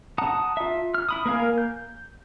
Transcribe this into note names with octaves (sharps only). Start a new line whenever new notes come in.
F#5 A5 A#5 D#6
F4 E5
F6
E4 B5 D#6
A#3 A#4 F5 G#5
G6